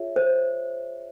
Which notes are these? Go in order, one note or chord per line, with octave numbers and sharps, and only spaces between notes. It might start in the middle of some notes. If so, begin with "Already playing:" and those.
Already playing: F4 G#4 C#5 E5
C5